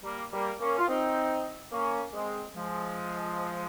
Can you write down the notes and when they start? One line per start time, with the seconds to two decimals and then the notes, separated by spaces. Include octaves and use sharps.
0.03 G3 A#3
0.31 G3 A#3
0.60 A#3 C#4
0.78 F4
0.88 C4 D#4
1.72 A#3 C#4
2.14 G#3 C4
2.56 F3 G#3